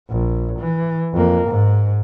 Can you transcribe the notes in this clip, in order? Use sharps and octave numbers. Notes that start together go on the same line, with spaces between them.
A#1
E3
F2 A#3
G#2